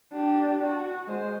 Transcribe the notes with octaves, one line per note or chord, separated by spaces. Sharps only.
D4 G4
F#4
G#3 C5